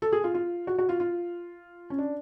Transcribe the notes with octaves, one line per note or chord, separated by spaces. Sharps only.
A4
G#4
F4
F4
F#4
F#4
F4
F4
C#4
D4